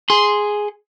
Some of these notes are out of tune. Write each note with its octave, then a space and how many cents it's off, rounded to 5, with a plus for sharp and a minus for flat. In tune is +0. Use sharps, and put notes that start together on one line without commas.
G#4 +0 C6 +0